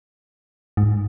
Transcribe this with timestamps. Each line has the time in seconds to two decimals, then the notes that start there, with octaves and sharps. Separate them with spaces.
0.77 G#2